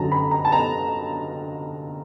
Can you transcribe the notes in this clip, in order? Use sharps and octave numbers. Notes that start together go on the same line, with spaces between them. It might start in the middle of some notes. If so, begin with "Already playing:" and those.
Already playing: F#2 D3 F#3 A5 A#5
B5
A#5
A5
A#5